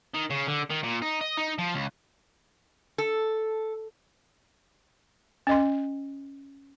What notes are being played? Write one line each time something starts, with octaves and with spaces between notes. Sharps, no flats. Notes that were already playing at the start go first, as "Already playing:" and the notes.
D#3
C#3
D3
D#3
A#2
D#4
D#5
D#4
F3
C#2
A4
C#4 D#5 C6